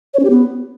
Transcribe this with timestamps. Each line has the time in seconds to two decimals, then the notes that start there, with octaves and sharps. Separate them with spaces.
0.14 C#5
0.19 C#4
0.25 G4
0.30 B3